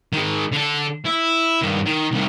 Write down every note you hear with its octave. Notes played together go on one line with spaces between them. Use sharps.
D#3 G#3
D3 A4
E4
G2 D#3
D#3
C2 D#3